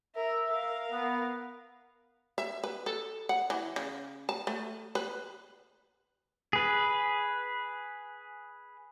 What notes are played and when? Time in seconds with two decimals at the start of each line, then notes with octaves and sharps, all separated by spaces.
0.15 A#4 E5
0.48 A#4 F5
0.91 B3
2.38 E5
2.64 B4
2.86 A4
3.29 F#5
3.50 E3
3.76 C#3
4.29 A5
4.47 A3
4.95 B4
6.53 G#4 B4